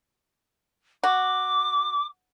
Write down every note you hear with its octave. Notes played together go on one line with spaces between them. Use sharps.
F#4 D6